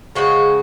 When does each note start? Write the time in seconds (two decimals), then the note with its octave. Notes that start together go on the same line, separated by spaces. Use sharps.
0.15 C#3 F3 G#3 F#4